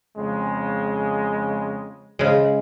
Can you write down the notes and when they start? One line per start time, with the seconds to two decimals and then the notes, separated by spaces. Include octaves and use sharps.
0.16 F2 C#3 G#3
2.19 C#3 G#3